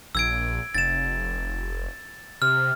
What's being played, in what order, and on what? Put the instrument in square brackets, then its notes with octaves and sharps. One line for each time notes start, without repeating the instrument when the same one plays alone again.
[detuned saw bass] A#1 [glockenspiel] E6 G#6 D7
[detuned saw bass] F1 [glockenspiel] A6 E7
[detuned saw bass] C3 [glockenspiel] F6